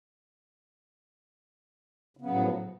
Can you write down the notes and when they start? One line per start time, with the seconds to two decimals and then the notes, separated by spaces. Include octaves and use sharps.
2.17 C#3
2.22 B3
2.26 F#3
2.30 A2
2.35 F3